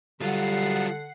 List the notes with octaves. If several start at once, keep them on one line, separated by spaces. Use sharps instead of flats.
D3 F#3 G3 F4 F#5 C7